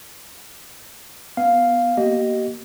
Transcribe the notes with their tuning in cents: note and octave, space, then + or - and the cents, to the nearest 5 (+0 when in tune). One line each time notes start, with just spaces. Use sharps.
B3 +0 F5 +0
A#3 +5 G4 -35 D#5 +0